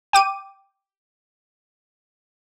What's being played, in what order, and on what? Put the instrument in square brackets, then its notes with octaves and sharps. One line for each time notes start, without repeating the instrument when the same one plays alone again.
[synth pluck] G5 D6 D#7